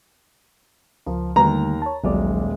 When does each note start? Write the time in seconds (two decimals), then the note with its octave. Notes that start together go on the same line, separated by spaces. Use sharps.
1.06 C#2 F3 F4 A#4
1.36 D#2 D3 G3 A3 A#5
1.82 C#5 A5
2.04 D#1 A#1 F#3 G#3 D5